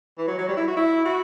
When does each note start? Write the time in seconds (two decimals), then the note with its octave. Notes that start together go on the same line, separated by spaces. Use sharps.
0.18 E3
0.28 F#3
0.38 F#3
0.48 G3
0.57 E4
0.68 F#4
0.77 E4
1.05 F#4